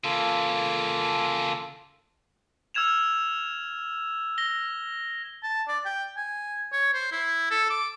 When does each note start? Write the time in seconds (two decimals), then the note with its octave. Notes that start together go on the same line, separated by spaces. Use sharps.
0.04 C#3 E3 A#3 F4 A4
2.74 E6 F6 G#6 E7 F7
4.38 A#6 G7
5.43 A5
5.68 D5
5.85 G5
6.17 G#5
6.73 C#5
6.94 C5
7.11 E4
7.50 A4
7.70 D6